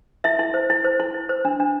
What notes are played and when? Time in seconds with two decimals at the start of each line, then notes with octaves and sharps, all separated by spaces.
0.24 E4 E5
0.39 E4
0.54 C5
0.70 E4
0.84 C5
1.00 E4
1.14 E4
1.29 C5
1.45 D4
1.60 D4